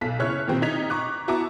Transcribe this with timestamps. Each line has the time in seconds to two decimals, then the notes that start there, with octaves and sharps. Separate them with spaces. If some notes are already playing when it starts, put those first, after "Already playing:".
0.01 B1 A4 B6
0.19 F#1 E4 C#5 F6 F#6
0.47 A#2 D#3 C4 G4
0.62 C3 D#4 G#6 B6 F7
0.90 A#5 C#6 D6 F#6
1.28 B3 E4 F#4 A5 A#5 D6